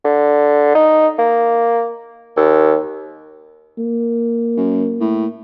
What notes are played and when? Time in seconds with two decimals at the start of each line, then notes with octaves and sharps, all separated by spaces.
0.05 D3
0.75 D#4
1.19 A#3
2.37 D#2
3.78 A#3
4.57 F#2
5.00 A2